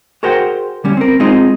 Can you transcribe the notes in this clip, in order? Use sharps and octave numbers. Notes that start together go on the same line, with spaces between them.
F#4 G#4 A#4 C5 F#5 G5
D3 G3 C#4
C4 A#4
G#3 C4 D#4 F4 G#4